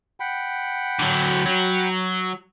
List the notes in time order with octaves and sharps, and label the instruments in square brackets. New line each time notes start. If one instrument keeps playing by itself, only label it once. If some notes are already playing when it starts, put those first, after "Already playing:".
[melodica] F#5 G5 B5
[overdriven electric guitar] D3 F#3
F#3